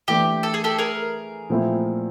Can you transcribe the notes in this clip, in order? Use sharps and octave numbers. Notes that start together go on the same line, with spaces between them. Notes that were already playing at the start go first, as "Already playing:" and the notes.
E3 A3 D4 G4
A4
G#4
G4 A4
G#4 A#4
A#2 F3 A3 C4 E4